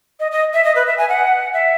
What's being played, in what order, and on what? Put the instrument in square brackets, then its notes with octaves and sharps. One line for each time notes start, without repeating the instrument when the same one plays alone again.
[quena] D#5
D#5
E5
D#5
B4
E5
G#5
F#5
E5